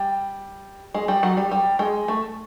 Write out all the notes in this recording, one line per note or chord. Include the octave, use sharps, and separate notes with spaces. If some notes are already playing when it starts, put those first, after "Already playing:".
Already playing: G3
G#3
G3
F#3
G3
G3
G#3
A3